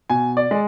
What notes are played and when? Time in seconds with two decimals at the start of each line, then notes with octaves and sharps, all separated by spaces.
0.10 B2 G#5
0.37 D5
0.51 G#3